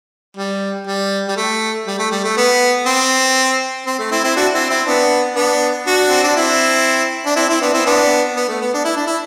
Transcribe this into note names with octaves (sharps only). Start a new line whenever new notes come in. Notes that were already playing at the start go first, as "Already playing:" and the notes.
G3
G3
G3
A3
G3
A3
G3
A3
B3
C4
C4
A3
C4 E4
C4 E4
D4 F#4
C4 E4
C4 E4
B3 D4
B3 D4
D4 F#4
C4
D4
C4 E4
D4
C4 E4
C4 E4
B3 D4
C4 E4
B3 D4
B3
A3
B3
D4
E4
D4
E4